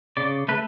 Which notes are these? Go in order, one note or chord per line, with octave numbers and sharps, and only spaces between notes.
C#3 D5
A3 B4